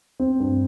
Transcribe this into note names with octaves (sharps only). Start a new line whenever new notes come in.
C4
G2